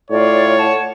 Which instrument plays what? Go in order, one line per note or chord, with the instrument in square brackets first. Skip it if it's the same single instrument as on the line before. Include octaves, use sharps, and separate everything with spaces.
[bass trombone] A2 [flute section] F4 D5 [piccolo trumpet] C#5
[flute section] F#5 A5